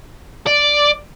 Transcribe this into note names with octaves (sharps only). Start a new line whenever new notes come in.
D5